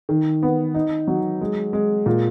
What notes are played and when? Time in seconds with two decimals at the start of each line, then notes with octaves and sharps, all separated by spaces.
0.09 D#3
0.43 B3
0.74 D#4
1.08 F#3
1.41 G#3
1.73 G#3
2.06 A#2